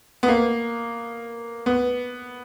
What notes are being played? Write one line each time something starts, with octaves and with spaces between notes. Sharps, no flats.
B3
A#3
B3